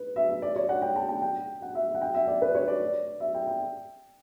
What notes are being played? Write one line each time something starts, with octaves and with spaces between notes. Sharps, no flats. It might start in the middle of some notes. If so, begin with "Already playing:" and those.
Already playing: B4
E5
E5
D5
C#5
F#5
G5
A5
G5
G5
F#5
E5
F#5
G5
E5
D5
B4
C#5
D5
E5
G5
G5